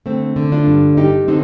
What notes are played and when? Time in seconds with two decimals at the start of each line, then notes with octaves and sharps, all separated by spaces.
0.06 D3 A3 C4
0.36 D3
0.52 D4 F4
0.67 G2
0.97 G2 D#4 G4
1.28 D3 C4 D#4